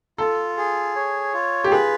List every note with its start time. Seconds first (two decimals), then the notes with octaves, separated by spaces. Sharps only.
0.18 F4 A4
0.57 G#4
0.96 C#5
1.34 F4
1.64 G4
1.72 G#4 B4